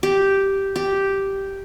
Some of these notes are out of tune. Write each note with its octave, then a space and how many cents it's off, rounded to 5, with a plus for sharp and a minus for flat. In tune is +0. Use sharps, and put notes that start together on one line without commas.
G4 -5
G4 -5